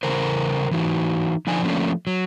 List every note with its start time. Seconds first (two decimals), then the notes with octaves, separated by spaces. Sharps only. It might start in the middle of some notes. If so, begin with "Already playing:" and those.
0.03 C#3 E3 A#4 C5
0.71 E3 D#4 F#4
1.47 D3 F3 D4 D#4 G#5
1.64 F3 A3 A#3 C#4 D4
2.07 F#3